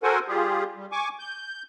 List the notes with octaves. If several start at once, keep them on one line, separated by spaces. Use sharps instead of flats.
F#4 A4 A#4 C5 F#5 G#5
G3 F4 G4 G#4
G3
G#5 C#6 D6
G6